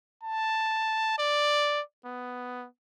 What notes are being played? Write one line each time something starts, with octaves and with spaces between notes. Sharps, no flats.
A5
D5
B3